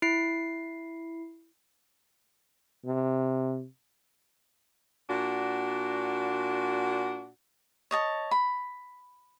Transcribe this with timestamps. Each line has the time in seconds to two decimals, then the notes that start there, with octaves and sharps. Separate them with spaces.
0.02 E4 C7
2.85 C3
5.08 A#2 D4 F#4
7.91 C#5 D#5 A5
8.31 B5